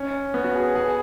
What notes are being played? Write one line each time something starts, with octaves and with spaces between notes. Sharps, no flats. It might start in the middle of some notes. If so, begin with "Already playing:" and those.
Already playing: C#4
B3
F#4
G#4
G#4